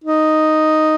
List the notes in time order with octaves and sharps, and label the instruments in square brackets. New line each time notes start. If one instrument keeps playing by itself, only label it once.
[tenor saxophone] D#4